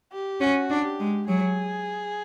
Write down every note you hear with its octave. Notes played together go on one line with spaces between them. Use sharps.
G4
C#4 F#4
D4
G4
G#3
F#3 G#4